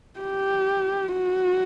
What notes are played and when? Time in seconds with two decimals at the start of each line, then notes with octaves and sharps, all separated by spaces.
0.20 G4
1.13 F#4